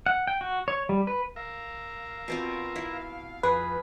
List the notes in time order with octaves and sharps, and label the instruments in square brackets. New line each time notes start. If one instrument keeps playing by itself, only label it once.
[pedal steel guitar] F#5
G5
F#4
C#5
G3
B4
[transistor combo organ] A#4 E5 [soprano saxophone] F5
[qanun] B2 C4 F4
E4
[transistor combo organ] F2 B5 [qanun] G#4 [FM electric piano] B4